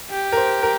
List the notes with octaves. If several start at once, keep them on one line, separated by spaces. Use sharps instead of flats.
G4
A#4
C5
A#4